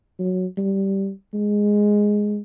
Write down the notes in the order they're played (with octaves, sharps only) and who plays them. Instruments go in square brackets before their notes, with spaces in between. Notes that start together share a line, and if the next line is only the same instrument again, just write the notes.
[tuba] F#3
G3
G#3